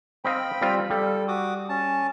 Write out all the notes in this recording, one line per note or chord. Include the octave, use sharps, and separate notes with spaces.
C4 D#5 F5 G5 B5
G3 C4 F4
G3 A4
F#4 D6 D#6
C#4 A5